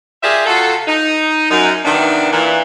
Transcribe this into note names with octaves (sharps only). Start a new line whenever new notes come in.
F4 G4 G#4 A#4 D5 E5
C3 F4 F#4 A4
D#4
F#2 D#4
C3 D#3 E3 B3 D4
A#2 E3